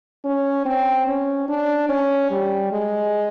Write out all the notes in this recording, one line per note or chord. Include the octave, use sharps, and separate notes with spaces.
C#4
C4
C#4
D4
C#4
G3
G#3